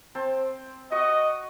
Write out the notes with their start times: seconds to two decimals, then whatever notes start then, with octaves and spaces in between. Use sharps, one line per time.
0.15 C4 C5 A5
0.92 F#4 D#5 C#6